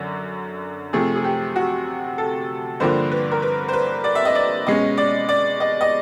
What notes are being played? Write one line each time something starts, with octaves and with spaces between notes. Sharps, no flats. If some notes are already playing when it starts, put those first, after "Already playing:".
Already playing: F#2 D3
C3 F3 A3 G#4
G#4
G4
F#4
A4
G2 D3 F3 A#3 C5
B4
A#4
B4
C5
B4
D5
E5
D#5
D5
B2 G#3 C#4 D#5
D5
D5
D#5
D#5